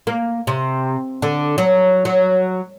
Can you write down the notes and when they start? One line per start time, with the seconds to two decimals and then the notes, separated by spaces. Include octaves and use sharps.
0.07 A#3
0.47 C3
1.22 D3
1.58 F#3
2.05 F#3